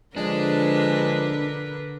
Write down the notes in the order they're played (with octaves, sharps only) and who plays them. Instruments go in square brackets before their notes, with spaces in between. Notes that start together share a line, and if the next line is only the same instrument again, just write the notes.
[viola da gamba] D3 A#4 B4 [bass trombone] F3 [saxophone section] G#3 [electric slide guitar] D4